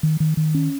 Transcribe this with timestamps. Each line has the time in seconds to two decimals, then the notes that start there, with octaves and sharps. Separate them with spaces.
0.03 D#3
0.20 D#3
0.37 D#3
0.54 C#4